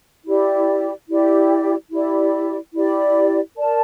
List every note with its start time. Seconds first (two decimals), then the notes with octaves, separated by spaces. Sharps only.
0.25 E4 G4 D5
1.08 E4 G4 D5
1.90 E4 G4 D5
2.73 E4 G4 D5
3.56 A#4 D5 A5